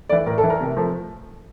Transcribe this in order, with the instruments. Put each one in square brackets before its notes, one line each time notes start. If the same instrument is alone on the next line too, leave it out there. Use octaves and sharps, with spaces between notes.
[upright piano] A3 D5
E3
A2 A#4
A4
E3 A3
A#4
C3
F3 A3